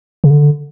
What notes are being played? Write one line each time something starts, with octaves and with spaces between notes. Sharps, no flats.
C#3
D3